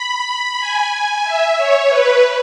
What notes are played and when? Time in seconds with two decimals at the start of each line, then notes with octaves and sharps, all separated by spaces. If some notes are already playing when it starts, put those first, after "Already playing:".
Already playing: B5
0.60 G#5
0.92 G#5
1.24 E5
1.57 C#5
1.89 B4